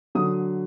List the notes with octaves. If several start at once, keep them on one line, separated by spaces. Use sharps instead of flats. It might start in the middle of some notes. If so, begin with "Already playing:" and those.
D3 F#3 D#6